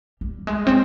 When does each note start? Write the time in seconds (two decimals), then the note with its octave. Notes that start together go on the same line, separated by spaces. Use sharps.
0.21 G3
0.47 G#3
0.67 C4